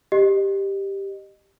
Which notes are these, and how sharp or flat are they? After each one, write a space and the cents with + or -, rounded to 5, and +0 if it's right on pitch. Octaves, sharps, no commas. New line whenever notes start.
G4 +0 D#5 -25